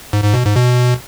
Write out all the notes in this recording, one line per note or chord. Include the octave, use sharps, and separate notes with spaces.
G#2
G#2
B2
G#2
B2